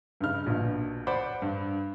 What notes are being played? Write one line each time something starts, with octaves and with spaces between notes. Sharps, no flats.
G2 C#3 D#4 F6
A#1 B2 D3
C5 D5 F#5 B5 D6
G2